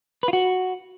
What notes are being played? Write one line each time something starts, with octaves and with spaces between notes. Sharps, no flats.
B4
F4
F#4